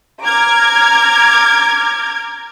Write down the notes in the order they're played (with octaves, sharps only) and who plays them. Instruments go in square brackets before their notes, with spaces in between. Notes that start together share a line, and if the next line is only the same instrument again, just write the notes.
[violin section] A#5 D6 F6 G#6